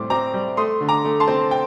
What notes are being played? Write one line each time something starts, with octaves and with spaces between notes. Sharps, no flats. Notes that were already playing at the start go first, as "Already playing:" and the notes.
Already playing: A2 G3 C4 C6 D6
C4 A#5 D6
G3
A3 C6 D#6
D3
A#5 D6
A3
A5 C6
C4
G5